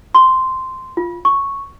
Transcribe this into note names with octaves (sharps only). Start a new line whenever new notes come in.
C6
F4
C#6